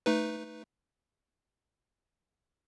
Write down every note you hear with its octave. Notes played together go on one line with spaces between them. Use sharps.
A3 D#4 B4